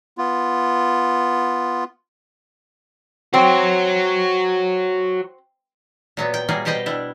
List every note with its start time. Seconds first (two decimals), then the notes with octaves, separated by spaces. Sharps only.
0.18 B3 F4
3.34 C4 F#4 C#5
6.17 A#2 F#3 B3
6.34 G5
6.49 F#3 G3 A#3 G#4
6.65 B2 G4 C5 D5 D#5 G5
6.86 G3 D4 E4